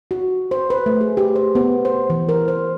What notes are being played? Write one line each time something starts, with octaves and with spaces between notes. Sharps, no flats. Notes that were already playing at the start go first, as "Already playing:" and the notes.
F#4
C5
B4
A3
G#4
G4
C5
B3
C5
E3
A#4
C5